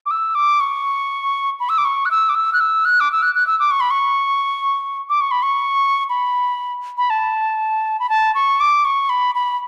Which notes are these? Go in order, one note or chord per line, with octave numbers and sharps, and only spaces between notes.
D6
E6
D6
C#6
B5
E6
D6
C#6
F#6
E6
D6
E6
F#6
E6
F#6
D6
E6
F#6
F#6
E6
D6
C#6
B5
C#6
D6
C#6
B5
C#6
B5
B5
A5
B5
A5
C#6
D6
C#6
B5
B5